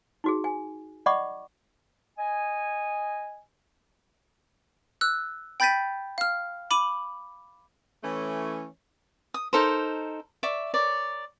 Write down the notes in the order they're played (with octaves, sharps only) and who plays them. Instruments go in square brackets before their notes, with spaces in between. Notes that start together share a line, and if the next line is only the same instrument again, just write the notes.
[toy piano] D#4 F#4 G#4
G#5
D5 D#5 F#5 B5 C#6 D6
[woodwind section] D#5 G#5
[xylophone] E6 F#6
G5 B5 G6 A6 B6 D#7
F5 F6
B5 D6 D#7 F#7
[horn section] E3 A3 C#4
[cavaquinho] D#6
D#4 A4 A#4 C5
D5 E5 C#6
A#4 C#5 D5